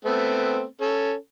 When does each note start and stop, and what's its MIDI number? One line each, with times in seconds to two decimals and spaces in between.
0.05 0.63 57
0.05 0.63 59
0.05 0.63 60
0.81 1.13 61
0.81 1.13 69